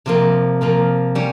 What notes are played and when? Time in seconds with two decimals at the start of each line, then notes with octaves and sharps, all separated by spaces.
0.06 C3 F3 A#3
0.61 C3 F3 A#3
1.15 G3 C#4